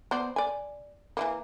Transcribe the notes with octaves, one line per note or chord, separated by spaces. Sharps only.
B3 C5 D5
D5 G#5
E3 G3 A#3